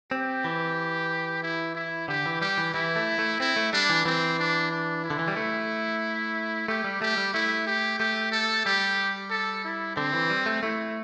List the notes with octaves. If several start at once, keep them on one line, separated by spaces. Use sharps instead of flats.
C4 G4
E3
E4
E4
D3 G4
E3
G3 G4
E3
E3 E4
A3
A3
C4 E4
A3
G3 D4
E3
E3 C4
D4
D4
E4
D3
E3
G3
A3
A3 G4
G3
A3 G4
G3
A3 E4
G4
A3 G4
A4
G3 G4
A4
E4
D3 C4
E3
G3
A3
A3 E4